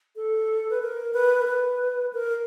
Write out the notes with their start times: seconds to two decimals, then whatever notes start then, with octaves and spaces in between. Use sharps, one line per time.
0.16 A4
0.70 B4
0.82 A#4
1.14 B4
1.42 A#4
1.47 B4
2.13 A#4